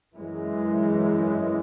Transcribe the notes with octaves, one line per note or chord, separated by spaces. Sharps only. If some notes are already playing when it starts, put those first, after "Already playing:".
F#2 E3 G#3